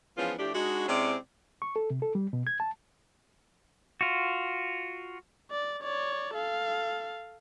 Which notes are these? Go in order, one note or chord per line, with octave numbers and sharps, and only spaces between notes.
E3 F3 G#3 B3 C#4 F4
A2 F3 A3 D4 G4
G#3 D4 D#4 F#4
C3 G#3 C4 C#4 E4 D5
C#6
A4
C3
A4
G3
B2
G#6
A5
F4 F#4
D5
C#5 D5
A4 F5